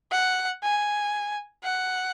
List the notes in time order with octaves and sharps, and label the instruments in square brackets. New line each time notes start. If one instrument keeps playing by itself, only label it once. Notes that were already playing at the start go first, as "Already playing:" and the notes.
[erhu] F#5
G#5
F#5